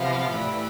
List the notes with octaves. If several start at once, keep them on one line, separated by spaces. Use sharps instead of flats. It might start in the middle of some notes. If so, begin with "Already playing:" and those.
Already playing: C3 F3 B3 F5
A2 E3 G3 B5